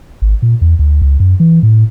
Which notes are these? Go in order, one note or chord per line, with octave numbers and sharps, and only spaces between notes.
G#1
A#2
E2
D2
C#2
F#2
E3
A2